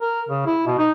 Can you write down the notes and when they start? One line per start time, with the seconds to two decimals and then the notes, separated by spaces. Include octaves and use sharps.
0.01 A#4
0.29 C#3
0.46 E4
0.67 B2
0.78 D#4